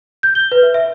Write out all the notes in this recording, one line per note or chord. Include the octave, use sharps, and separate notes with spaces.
G6
G7
B4
E5
E5